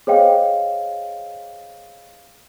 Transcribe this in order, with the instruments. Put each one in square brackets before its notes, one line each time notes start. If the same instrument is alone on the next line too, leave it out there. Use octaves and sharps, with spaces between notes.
[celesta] G#4 C5 C#5 D#5 F5 G5